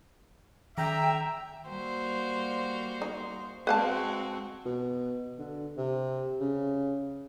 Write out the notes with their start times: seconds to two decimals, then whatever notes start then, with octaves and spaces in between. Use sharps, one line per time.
0.78 D#3 E5 G5 A#5
1.68 G3 A#3 F#4 C5
3.02 D#4
3.67 G#3 C4 F#4 B4 F5 A5
4.66 B2
5.39 D3
5.77 C3
6.40 C#3